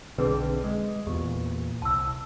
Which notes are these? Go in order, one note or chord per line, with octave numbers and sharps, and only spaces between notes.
B1 D3 C4 G#4 B4
G#3
E2 A#2 G4
C2 A5 E6